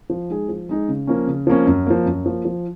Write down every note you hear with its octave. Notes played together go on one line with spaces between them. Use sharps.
F3
G#3 D#4 G#4
F3
G#3 D#4 G#4
C#3
F3 A#3 C#4
C#3
F3 A#3 C#4
F#2
F3 A#3
F#2
F3 A#3
F3